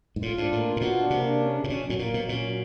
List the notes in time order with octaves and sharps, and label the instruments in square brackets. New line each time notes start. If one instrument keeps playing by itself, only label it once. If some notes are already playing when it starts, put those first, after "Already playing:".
[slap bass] G#2
[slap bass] A2 [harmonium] F4
[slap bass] G#2 [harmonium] D4
[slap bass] A2 [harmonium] A#3
[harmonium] F4
[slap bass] A#2
[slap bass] B2 [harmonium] F#4
[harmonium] D4
[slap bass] C3 [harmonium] A#3
[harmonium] D4
C#4
C#3
[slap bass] A#2
[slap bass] B2 [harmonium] C#4
[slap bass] A2 [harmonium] F#3
[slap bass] A#2 [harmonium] A#3
[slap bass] B2 [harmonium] F#3
[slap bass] A#2 [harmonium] C#4
[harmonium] F#3